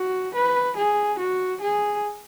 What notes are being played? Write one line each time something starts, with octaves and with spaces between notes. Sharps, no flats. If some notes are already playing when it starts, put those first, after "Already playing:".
Already playing: F#4
B4
G#4
F#4
G#4